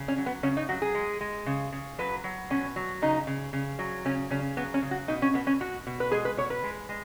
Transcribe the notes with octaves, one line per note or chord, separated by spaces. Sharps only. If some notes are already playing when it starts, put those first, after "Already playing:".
Already playing: C#3
C#4
F#3
B3
C#3 C#4
D#4
F#3 F#4
G#4
G#3
G#3
C#3
C#3
F#3 B4
F#3
B2 C#4
F#3
C#3 D#4
C#3
C#3
F#3
C#3 C#4
C#3 C#4
F#3 B3
C#4
C#3
F#4
B2 D#4
C#4
B2 B3
C#4
B2 F#4
B2
B4
G#3 G#4
B4
B2 C#5
B4
G#3
G#3